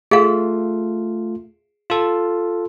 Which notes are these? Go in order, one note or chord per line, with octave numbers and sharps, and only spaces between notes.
A3 F4 G#4 F5
F4 A4